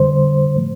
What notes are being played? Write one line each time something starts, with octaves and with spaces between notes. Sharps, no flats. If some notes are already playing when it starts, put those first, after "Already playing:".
Already playing: F2 D3 G3 C5
A2 F3 A3